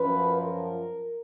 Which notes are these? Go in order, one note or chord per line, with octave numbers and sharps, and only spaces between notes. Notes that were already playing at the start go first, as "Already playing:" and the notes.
Already playing: F#2 F3 B4
A#4